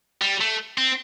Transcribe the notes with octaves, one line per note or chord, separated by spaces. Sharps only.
G3
A3
C4